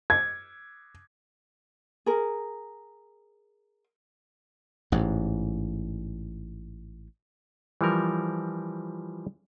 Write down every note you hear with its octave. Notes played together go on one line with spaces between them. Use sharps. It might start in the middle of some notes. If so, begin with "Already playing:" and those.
G#6
G#4 A#4
A1 G#2
E3 F3 G3 A#4